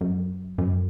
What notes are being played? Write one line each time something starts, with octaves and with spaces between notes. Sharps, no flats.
F#2
F#2